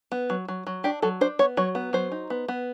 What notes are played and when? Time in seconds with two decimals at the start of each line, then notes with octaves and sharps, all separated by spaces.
0.12 B3
0.30 F#3
0.48 F#3
0.67 F#3
0.84 D4 G4
1.02 F#3 A4
1.21 D4 C5
1.39 B3 C#5
1.57 F#3 C#5
1.75 B3
1.93 F#3 C5
2.12 D#4
2.30 B3
2.48 B3